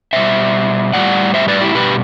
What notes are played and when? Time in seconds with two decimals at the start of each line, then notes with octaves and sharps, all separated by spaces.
0.13 B2 G3 C5 E5
0.94 A2 E3 G3 D5 F#5
1.34 C5 E5
1.48 B4 D5
1.61 E4 G4
1.75 B2 G3 G4 B4